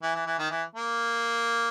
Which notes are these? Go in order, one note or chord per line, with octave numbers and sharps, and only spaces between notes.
E3
E3
E3
D#3
E3
A#3